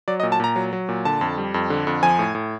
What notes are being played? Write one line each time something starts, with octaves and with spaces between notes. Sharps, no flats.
F#3 D5
D#5
A#2
A5
A#2 A#5
F#3
F#3
A#2
D3 A5
F2
G3
F2
D3
F2
F3 G#5
A2
A2